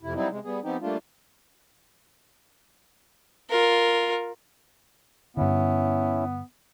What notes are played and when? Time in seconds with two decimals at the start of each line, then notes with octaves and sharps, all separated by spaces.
0.02 F2 C3 E4
0.15 F#3 G3 C4 D#4 E4
0.29 C3 G#3
0.44 G3 B3 G#4
0.63 F3 B3 C4 D#4 G4
0.81 G3 A3 A#3 D4 F4
3.50 F4 A#4
5.37 G2 D3 B3 C#4 E4